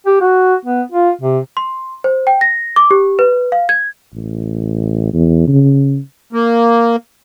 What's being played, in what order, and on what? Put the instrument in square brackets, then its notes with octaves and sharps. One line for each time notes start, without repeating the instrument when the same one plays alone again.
[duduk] G4
F#4
B3
F4
C3
[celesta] C6
C5
G5
A#6
D6
G4
B4
F5
G#6
[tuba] A1
E2
C#3
[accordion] A#3